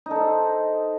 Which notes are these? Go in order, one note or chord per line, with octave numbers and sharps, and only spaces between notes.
D#4 A4 C5